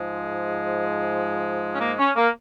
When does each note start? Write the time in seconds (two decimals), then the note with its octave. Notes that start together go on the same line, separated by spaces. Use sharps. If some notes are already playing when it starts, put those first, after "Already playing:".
Already playing: G#2 F3 G#3
1.75 C#4
1.79 A#3
1.98 C#4
2.15 A#3